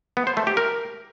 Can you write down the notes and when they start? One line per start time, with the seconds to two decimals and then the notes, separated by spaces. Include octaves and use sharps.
0.17 B3
0.27 C5
0.37 A3
0.47 G4
0.57 A#4